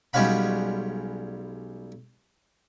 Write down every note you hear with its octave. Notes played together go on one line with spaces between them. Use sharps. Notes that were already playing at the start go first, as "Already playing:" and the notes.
B1 G3 G#3 C#4 F5 B5